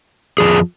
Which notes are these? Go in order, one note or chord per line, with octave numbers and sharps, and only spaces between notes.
F2 F3 G#4